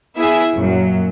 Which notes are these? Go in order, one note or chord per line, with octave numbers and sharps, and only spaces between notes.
B3 E4 G#4 E5
F#2 A#2 F#3